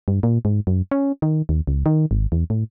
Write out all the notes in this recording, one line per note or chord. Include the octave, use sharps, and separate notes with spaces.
G2
A#2
G#2
F#2
C#4
D#3
D#2
C#2
D#3
G#1
E2
A2